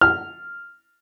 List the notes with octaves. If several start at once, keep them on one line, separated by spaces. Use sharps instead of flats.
F6